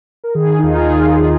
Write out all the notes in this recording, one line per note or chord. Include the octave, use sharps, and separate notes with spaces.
A#4
D#3 G#4
D#4
D#2 F4
G#4
D#3 F4